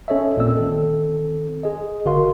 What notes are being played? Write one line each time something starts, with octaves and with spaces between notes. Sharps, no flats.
C#4 A4 C#5 D#5 E5
A1 A#2 A#3 C4 D5 E6
D#3 C4 A4
G#4 D#5
G1 D3 F#4 A#4 F5 C6